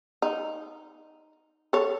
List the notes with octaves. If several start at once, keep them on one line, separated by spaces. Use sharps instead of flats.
D#4
A4 C#5